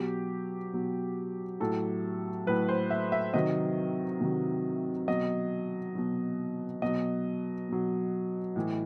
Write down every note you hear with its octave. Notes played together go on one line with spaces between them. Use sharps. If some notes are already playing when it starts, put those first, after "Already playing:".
Already playing: B2 F#3 G4
B2 F#3
A2 F#3 A4
A2 F#3 B4
C5
E5
E5
C3 D#3 F#3 D#5
C3 D#3 F#3
B2 F#3 D#5
B2 F#3
B2 F#3 D#5
B2 F#3
A2 E3